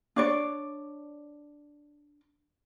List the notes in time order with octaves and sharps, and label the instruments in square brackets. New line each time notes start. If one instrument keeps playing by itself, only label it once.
[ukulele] D4 C#5 D5